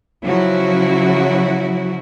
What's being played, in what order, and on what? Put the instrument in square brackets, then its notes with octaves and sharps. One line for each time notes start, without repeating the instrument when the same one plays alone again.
[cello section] C#3 F3 F#3 E4 F#4